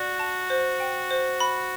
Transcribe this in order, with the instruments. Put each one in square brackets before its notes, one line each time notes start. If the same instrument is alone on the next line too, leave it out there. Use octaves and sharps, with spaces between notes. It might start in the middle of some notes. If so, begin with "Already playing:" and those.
Already playing: [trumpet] F#4 [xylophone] D5
[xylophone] A5
C5
G5
C5
B5